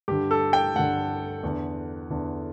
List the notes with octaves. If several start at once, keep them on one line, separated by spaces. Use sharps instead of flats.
G2 D3 G4
A4
G5
G2 D3 F#5
E2 D3
E2 D3